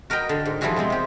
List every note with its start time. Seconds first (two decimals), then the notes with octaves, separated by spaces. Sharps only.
0.10 F#4 A#4 B4 D#5 G5
0.29 D3
0.45 G#2
0.61 E3 F3 G3 E4 F#4 G#4
0.76 B2 E3 G#3 C4
0.90 C3 G4